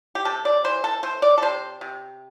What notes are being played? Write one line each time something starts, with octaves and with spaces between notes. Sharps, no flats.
G4
C3 A4
D5
E3 C5
A4
A3 C5
D5
A4
C3 C5
C3